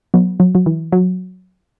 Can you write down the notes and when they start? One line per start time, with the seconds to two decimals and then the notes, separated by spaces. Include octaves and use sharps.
0.14 F#3 B3
0.40 F#3
0.55 F#3
0.66 E3
0.92 F#3